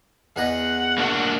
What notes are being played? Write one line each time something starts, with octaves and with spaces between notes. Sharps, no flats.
E2 B4 D#5 F#5
A#3 D4 F#4